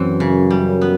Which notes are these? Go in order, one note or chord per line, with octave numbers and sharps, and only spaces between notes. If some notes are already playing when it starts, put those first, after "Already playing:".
Already playing: F#2 E3 C4
C#3
G3
B3